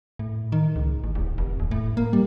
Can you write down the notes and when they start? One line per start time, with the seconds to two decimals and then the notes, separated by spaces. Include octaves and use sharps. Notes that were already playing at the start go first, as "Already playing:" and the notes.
0.19 A2
0.52 D#3
0.76 C#2
1.04 A1
1.15 D1
1.38 F1
1.60 D#1
1.71 A2
1.97 A#3
2.13 G3